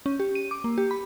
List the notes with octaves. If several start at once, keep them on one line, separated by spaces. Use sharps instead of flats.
C#4
G4
D#7
D6
A#3
G4
B5